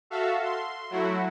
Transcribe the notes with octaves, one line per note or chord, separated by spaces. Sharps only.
F#4 A4 E5 F5
C6
F#3 A3 E4 F#4